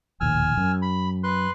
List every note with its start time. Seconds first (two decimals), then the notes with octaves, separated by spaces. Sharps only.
0.21 E1 A#1 D#2 G#5 E6 F6
0.57 F#2
0.82 B5
1.24 B4 C6 F#6